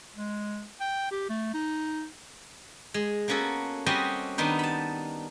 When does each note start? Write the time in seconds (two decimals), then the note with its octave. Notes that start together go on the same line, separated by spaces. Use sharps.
0.16 G#3
0.80 G5
1.11 G4
1.29 A3
1.54 D#4
2.94 G#3
3.28 A#3 B3 C#4 F#4 A4
3.86 G3 C4 C#4 F#4 G4 D#5
4.38 D#3 B3 D4 D#4 C5
4.59 A5 B5